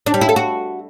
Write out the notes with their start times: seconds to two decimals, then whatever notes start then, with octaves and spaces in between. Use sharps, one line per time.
0.06 D4
0.14 G3
0.21 E4
0.29 A4
0.36 F#4